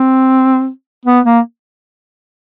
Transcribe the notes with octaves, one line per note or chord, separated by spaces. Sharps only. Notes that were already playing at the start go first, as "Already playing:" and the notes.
Already playing: C4
B3
A#3